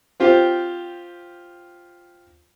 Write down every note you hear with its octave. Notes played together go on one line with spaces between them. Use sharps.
C4 F4 G4